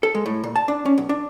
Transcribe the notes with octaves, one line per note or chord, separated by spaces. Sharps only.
A4
G#3
A2
A#2
A5
D4
C#4
B1
D4